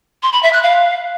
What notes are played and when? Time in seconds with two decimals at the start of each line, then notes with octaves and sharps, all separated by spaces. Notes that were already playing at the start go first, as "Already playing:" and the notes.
0.23 C6
0.33 B5
0.43 E5
0.53 F#6
0.63 F5